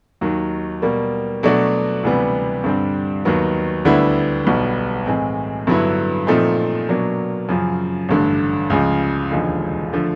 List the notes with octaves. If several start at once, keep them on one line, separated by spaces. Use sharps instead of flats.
D#2 D#3 F#3
B2 G3 A#3
B2 F#3 A3 D4 F#4
D2 C3 E3 G3 B3
G2 D3 G3 C4
D#2 D#3 F#3 B3
D2 D3 G3 B3 E4
B1 B2 G3 B3
A2 E3 G#3 C4
G2 D3 F#3 B3 E4
A#2 F3 A3 C4 D#4
B2 F#3 A#3 D4
F#2 C#3 F3
A1 G2 D3
C#2 C#3 F3
E1 D#2 D3 F3 G#3
D3 F3 A3